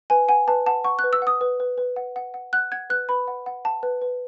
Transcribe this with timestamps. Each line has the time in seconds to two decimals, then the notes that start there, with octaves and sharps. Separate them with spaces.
0.10 B4 G#5
0.28 F#5 G#5
0.48 B4 A5
0.66 F#5 A5
0.84 F#5 C#6
0.99 F#6
1.04 B4
1.13 E6
1.22 F#5 D#6
1.41 B4
1.60 B4
1.78 B4
1.96 F#5
2.16 F#5
2.34 F#5
2.53 F#5 F#6
2.72 F#5 G#6
2.90 B4 F#6
3.09 B4 B5
3.28 F#5
3.46 F#5
3.65 F#5 A5
3.83 B4
4.02 B4